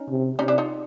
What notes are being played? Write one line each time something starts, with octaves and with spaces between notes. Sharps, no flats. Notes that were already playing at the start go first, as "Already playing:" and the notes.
Already playing: C#4 D#4
C3
C3 C#4 D#4
D4 E4
D#4 F4